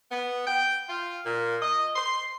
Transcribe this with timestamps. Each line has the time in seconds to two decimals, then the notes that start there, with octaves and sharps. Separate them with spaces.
0.11 B3
0.47 G5
0.90 F4
1.25 A#2
1.62 D#5
1.96 C6